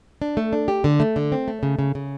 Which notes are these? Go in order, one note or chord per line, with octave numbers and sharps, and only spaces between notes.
D4
A3
D4
G4
D3
A3
D3
C4
A3
C#3
C#3
C#3